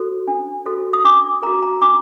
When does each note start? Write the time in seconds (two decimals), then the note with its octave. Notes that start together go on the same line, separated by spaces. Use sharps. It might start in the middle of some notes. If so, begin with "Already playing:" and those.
Already playing: F#4 A4 C5
0.27 D4
0.66 F#4 A4 C5
0.93 D#6
1.04 D4 D6
1.42 F#4 A#4 A#5
1.63 A#5
1.82 D4 D6